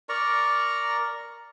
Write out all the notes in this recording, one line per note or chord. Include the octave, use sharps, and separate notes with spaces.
A#4 D5 A#5 C#6